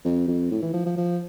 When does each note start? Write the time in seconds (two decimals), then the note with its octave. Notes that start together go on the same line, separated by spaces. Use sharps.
0.05 F2
0.28 F2
0.51 A2
0.62 E3
0.74 F3
0.86 F3
0.97 F3